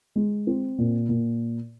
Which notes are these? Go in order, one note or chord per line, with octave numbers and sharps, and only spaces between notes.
G#3
C4
A#2
A#2